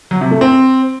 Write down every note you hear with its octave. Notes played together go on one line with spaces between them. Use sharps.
F#3
C3
A3
C4